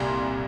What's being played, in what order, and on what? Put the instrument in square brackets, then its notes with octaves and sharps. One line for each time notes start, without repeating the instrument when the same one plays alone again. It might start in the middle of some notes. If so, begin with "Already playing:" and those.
Already playing: [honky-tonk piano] C2 A#2 G3 A#5 C6